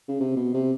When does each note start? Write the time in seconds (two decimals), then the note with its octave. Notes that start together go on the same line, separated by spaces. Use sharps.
0.08 C#3
0.20 C3
0.36 B2
0.54 C3